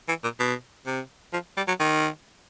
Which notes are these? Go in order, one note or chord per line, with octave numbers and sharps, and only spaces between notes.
E3
A#2
B2
C3
F3
G3
F#3
D#3